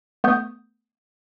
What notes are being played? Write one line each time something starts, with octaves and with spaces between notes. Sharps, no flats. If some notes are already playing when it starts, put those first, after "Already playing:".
A3 B3 C#6 D#6 G6